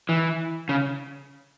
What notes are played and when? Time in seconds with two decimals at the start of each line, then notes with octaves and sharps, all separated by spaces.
0.09 E3
0.69 C#3